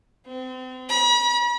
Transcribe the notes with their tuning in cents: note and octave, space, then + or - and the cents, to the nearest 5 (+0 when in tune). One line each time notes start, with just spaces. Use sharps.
C4 -35
B5 -40